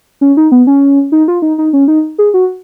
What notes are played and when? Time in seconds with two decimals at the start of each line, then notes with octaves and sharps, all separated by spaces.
0.21 C#4
0.37 D#4
0.52 B3
0.67 C#4
1.12 D#4
1.28 F4
1.42 D#4
1.58 D#4
1.73 C#4
1.88 D#4
2.18 G#4
2.34 F#4